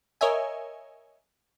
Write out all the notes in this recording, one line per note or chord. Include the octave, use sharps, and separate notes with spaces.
A#4 C#5 D#5 E5 G#5